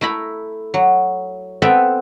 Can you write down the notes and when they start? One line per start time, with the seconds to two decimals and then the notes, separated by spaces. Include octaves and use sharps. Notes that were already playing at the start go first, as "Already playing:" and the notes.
0.01 A3 E4 A#5 B5
0.74 F#3
1.62 B3 C4 A4 B4 E5 G5